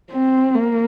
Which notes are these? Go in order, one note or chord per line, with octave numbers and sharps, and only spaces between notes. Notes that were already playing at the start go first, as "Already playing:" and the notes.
C4
A#3